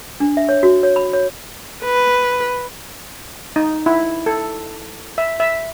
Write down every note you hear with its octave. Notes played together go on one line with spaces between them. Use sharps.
D4
E5
C#5
F#4
C#5
B5
C#5
B4
D#4
E4
A4
E5
E5